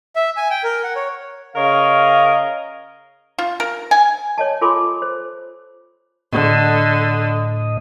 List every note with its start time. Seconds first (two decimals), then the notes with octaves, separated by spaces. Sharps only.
0.16 E5
0.37 G#5
0.50 G5
0.64 A#4
0.84 F#5
0.96 C#5
1.56 C#3 A#4 C#5 D#5 F5
3.38 F4
3.60 A#4
3.91 G#5
4.38 C#5 D#5 A5
4.61 F4 A4 G#5 B5 C6 D6
5.02 C5
6.33 A2 D3 D#5